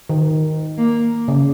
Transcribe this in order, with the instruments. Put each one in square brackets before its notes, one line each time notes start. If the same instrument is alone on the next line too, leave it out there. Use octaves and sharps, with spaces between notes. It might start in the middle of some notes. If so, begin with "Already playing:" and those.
[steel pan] D#3
[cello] A#3
[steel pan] C#3